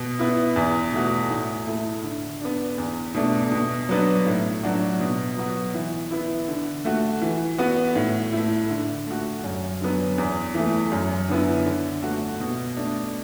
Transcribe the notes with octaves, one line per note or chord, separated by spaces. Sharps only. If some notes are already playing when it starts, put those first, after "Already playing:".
Already playing: B2
B3 E4
E2
B2 A3 F#4
A2
A3 E4
D3
B3 D4
E2
B2 A3 D4
B2
F#3 B3 D4
A2
F#3 D4 F#4
B2
F#3 B3 F#4
E3
B3 E4
D3
A3 F#4
E3
B3 F#4
A2
A3 E4
D3
A3 F#4
F#2
D3 F#3 B3
E2
E3 A3
F#2
D3 B3 E4
D3
A3 F#4
B2
A3 D4